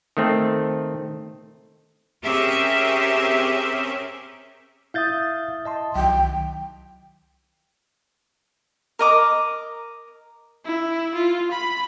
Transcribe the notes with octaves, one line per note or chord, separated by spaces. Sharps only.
D#3 A3 C4
C4 C#4 G4 G#4 A#4 E5
E4 E5 F5 D#6 G6 A6
D#5 A5 C6
C2 D#3 F#3 G5
A#4 D#5 D6
E4
F4
B5